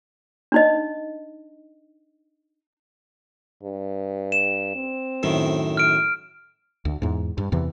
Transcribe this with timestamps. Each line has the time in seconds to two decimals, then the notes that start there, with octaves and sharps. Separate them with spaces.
0.52 D4 D#4 D#5
3.63 G2
4.32 E7
4.75 C4
5.23 F#2 A2 D#3
5.77 F6 D7
6.85 D2
7.02 E2 G#2
7.38 G2
7.52 E2 C3 E3